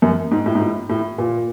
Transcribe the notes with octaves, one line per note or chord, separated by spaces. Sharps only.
F#2
G#2
A2
G#2
A2
A2
A#2